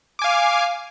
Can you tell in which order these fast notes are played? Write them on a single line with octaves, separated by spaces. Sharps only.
D6 G#5 F5